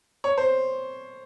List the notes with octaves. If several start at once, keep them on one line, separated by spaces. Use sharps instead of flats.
C#5
C5